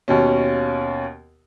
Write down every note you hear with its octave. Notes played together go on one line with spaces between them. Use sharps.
D#2 B2 C#4